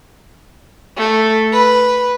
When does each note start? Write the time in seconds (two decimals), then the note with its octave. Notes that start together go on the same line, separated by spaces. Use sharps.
0.97 A3
1.52 B4